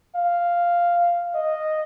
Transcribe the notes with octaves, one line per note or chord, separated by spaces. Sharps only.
F5
D#5